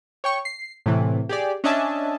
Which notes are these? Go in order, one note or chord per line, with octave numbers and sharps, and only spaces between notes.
C#5 G5 C#6
C7
A2 C3 E3
G4 G#4 D5
C#4 D4 D#5 E5 G#5 A5